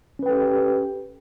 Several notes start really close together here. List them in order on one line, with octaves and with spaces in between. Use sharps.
C#4 B4 G5 A4 G4